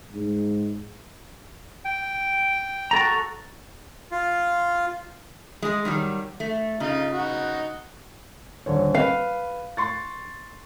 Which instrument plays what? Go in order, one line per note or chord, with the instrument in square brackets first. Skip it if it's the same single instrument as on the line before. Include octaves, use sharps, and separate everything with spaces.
[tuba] G#2
[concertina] G5
[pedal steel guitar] F#4 A4 A#5
[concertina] F4
[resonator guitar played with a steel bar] G#3 G#4
D#3 F#3 G3
A3
[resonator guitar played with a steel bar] C#3 [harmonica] D#4 F4
[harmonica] D#4 F#4
[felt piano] D#1 D3 C#5
[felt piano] B4 [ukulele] F5
[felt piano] C6 C#6 A6